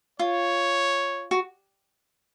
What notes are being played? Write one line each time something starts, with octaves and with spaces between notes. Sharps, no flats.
F4 C#5
F#4